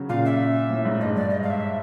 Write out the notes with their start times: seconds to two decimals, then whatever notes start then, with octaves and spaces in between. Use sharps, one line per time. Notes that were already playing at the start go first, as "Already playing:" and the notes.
Already playing: C#3 F#3
0.09 A#2 F5
0.25 E5
0.70 A2
0.85 G#2
1.00 G2 D#5
1.15 G#2 D5
1.30 D#5
1.43 F5
1.50 E5